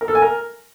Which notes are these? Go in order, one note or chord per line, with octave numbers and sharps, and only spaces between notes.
A#4
A4
G#5
A#4